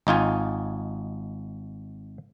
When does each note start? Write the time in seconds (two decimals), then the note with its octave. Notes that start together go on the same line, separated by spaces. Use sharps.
0.07 G#1 D#4 F4 G#5